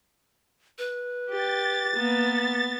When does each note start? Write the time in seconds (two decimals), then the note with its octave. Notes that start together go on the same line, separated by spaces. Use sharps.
0.78 B4
1.30 G4 A6
1.96 A#3 B3